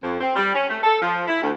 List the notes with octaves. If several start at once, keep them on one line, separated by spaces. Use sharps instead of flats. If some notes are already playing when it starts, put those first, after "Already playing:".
F2
C4
G3
C#4
A3
A4
F3
E4
D2